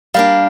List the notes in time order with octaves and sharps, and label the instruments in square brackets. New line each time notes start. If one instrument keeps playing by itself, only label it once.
[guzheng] G3 A#3 D4 [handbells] F5